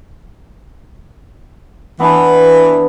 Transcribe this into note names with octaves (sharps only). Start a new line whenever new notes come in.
E3 B3 D4